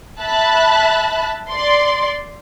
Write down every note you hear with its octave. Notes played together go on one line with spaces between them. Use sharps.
E5 A5 B5 F#6
D5 C6